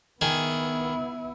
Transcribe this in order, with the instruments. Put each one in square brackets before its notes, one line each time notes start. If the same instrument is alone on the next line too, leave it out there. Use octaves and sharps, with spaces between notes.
[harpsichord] D#3 G#4 [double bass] B3 E4